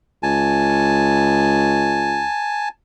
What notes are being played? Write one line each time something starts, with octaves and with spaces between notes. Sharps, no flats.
C#2 G#5 A5